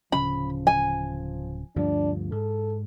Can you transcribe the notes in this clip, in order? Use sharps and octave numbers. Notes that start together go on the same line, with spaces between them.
D1 C#3 F3 C#4 B5
G#5
D2 G2 F3 D4
G#2 A4